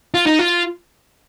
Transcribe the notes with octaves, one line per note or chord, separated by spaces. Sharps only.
F4
D#4
F4